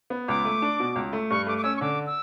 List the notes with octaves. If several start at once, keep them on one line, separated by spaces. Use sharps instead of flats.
B3
C#2 D6
A3
D4
B2
C#2
A3
G2 C#6
A3 D6
D6
C#4 E6
C#6
D3 D6
E6